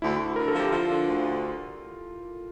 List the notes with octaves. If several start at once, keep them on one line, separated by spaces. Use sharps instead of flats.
D2 E4
D2
D3 A#4
A4
F3
G4
F3 F4
D3
D2
D3